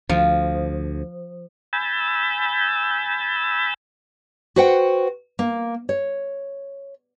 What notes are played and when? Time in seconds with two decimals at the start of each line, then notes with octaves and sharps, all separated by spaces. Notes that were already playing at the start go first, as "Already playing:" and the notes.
0.09 D2 F3
1.73 G#5 B5 E6 G6 A6
4.56 F#4 B4 C5 F#5 G5
5.39 A#3
5.89 C#5